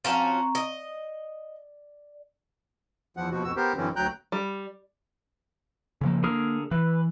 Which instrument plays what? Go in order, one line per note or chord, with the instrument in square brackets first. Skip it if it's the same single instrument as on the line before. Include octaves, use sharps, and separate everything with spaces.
[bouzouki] F3 C#4 F#4 [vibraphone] C4 A#5 C#6
[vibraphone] D5 [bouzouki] D#5
[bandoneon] E2 F3 F#5
D#2 B2 F3 F#4
F2 B2 F#4 E6
B3 G4 A#4 C5
F#2 D3 E3 C4 C#4
D2 F#3 G5 A#5 F#6 G6
[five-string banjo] G3
[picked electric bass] C#3 F3 A#3
[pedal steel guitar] D3 G#4 A#4 [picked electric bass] A#3
[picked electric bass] E3 [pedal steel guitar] B4